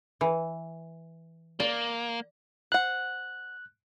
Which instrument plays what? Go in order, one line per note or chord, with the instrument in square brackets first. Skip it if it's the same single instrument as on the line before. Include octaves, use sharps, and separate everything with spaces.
[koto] E3
[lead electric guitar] A#3 [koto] D5
[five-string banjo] C5 F#5 [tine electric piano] F#6